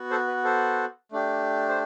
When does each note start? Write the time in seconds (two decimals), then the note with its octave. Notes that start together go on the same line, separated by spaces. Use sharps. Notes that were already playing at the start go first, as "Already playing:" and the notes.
Already playing: B3 F#4
0.11 A4 C5
0.28 B4
0.44 A4 C5
1.12 A3 D4 G4
1.69 C5